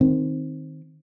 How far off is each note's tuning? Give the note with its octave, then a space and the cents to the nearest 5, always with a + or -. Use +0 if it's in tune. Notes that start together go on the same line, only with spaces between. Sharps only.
D#3 +0 C4 +0